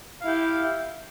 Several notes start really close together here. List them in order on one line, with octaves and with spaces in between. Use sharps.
F5 E4 G4